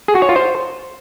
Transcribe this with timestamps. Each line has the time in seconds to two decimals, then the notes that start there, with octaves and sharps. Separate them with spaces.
0.08 G#4
0.15 F#4
0.22 C#5
0.29 F4
0.36 C5